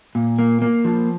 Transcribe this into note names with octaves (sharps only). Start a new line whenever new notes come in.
A#2
A#3
A#3
F3